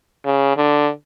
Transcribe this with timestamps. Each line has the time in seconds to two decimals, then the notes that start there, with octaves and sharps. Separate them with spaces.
0.25 C#3
0.57 D3